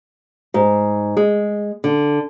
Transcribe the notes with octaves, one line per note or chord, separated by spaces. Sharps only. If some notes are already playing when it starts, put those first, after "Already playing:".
G#2
G#3
D3